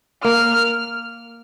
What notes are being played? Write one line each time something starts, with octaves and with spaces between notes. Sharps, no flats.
A#3 F6